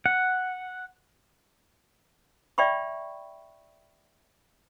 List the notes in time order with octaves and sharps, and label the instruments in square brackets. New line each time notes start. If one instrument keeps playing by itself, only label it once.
[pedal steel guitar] F#5
[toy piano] D5 E5 G5 B5 C#6